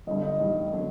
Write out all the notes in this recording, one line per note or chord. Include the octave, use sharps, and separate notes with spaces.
G1 G2 D3 D#5
D#5
A1 G2 D#3 D#5
D3 F#3